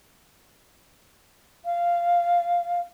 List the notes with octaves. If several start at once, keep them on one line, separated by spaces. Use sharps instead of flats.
F5